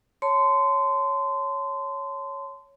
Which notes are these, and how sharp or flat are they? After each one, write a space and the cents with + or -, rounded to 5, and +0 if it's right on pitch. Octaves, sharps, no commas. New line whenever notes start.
C#5 +0 A5 +0 C6 -25